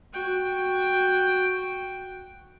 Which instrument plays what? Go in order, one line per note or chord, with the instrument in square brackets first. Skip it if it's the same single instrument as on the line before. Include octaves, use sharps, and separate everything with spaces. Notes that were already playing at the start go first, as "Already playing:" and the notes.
[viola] F#4 G5